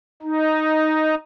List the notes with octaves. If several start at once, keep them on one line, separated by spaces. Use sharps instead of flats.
D#4